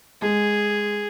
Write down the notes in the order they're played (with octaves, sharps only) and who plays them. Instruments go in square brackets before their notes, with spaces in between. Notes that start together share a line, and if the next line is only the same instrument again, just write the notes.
[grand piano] G#3 [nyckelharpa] G#4